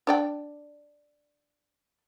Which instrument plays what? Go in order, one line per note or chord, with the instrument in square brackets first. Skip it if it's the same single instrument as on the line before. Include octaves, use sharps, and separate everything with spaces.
[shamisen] D4 D5 G5